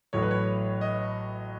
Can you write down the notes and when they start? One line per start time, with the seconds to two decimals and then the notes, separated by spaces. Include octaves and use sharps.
0.13 A1 A2 F#3 A3 C#5
0.23 B4
0.31 C#5
0.81 D#5